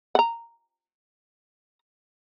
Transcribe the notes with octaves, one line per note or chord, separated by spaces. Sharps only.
F#5 A#5